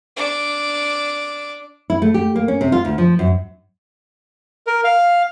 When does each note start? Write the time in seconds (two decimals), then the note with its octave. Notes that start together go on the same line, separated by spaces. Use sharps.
0.17 D4 D6
1.90 E4
2.02 A3
2.14 G4
2.36 A#3
2.48 C#4
2.61 C3
2.72 F4
2.85 D2
2.98 F3
3.19 F#2
4.67 A#4
4.84 F5